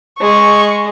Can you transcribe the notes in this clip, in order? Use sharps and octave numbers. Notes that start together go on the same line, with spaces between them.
G#3 C#6